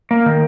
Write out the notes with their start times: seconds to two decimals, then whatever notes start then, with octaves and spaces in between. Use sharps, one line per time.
0.11 A#3
0.26 D#3